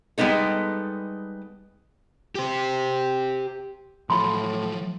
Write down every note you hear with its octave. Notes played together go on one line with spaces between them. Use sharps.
G3 G#3 B3 D#4 A4
G4 C5
A2 F3 F#3 B5 C6